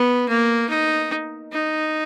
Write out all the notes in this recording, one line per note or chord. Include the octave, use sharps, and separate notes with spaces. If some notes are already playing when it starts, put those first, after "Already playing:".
Already playing: B3
A#3
D#4
D#4